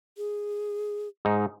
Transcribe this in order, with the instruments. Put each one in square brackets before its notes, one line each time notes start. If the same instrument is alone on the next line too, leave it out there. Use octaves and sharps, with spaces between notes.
[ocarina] G#4
[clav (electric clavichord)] G#2 D#4